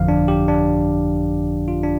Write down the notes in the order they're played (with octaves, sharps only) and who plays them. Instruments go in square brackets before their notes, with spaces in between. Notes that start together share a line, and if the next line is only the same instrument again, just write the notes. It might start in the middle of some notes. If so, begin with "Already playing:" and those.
Already playing: [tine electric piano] G1 F2 D3 F3 F5
D4
G4
D4
F4
D4